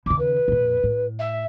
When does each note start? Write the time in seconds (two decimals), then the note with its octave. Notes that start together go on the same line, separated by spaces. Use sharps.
0.06 D#2 C#3 D6
0.18 B4
0.48 F2 A#2
0.83 A2
1.19 E5